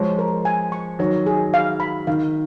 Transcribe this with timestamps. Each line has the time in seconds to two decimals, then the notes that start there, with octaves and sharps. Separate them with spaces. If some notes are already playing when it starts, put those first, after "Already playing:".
Already playing: F3 G#3 C#5
0.19 A#4
0.45 G#5
0.72 C#6
0.99 D#3 F#3 C#5
1.26 G#4
1.54 F5
1.80 B5
2.07 D#3 F5